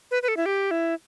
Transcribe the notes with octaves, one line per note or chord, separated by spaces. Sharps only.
B4
B4
A4
E4
G4
E4